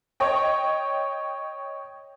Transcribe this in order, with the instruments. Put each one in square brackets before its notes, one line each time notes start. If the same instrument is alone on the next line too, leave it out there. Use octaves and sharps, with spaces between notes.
[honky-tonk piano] C#5 D#5 G5